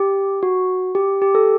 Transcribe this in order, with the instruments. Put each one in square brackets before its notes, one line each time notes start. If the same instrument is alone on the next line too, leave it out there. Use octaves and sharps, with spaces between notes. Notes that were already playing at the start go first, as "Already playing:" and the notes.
Already playing: [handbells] G4
F#4
G4
G4
A4